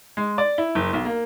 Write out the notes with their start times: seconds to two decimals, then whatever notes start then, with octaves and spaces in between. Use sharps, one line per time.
0.17 G#3
0.38 D5
0.58 E4
0.75 F#1
0.93 B1
1.05 A#3